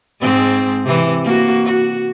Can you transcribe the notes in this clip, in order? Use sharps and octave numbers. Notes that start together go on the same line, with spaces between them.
G#2 G#3 C4
C3 E3
A#3 F#4
F#4